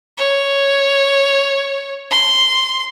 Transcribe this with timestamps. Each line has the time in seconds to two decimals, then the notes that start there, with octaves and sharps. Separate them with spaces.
0.18 C#5
2.11 C6